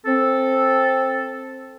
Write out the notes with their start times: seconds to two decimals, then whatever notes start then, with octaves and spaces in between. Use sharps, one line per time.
0.06 C4 A4